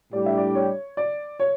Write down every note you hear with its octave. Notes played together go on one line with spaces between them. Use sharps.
A2 G3 D4 G4 D5
E5
D5
C#5
D5
C#5